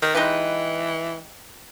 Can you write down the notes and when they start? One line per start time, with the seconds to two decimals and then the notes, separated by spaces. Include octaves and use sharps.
0.02 D#3
0.15 E3 G#3 D#4 G4 B4